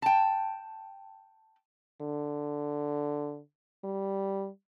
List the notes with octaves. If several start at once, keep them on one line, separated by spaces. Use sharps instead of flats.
G5 A5
D3
G3